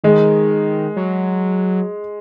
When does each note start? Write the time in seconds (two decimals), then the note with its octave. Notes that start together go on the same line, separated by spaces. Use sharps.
0.04 D#3 G#3
0.96 F#3